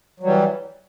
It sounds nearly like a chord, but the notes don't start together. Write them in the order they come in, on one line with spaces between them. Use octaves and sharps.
F#3 G3 E3